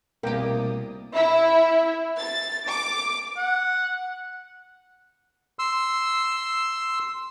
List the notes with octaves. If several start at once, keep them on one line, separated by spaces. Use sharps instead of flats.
C2 B2 A#3 G4 A#4 D5 G5 D#6
E4
A6
D6
F#5
C6 E6